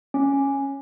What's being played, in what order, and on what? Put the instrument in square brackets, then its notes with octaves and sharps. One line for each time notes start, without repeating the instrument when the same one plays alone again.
[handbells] C#4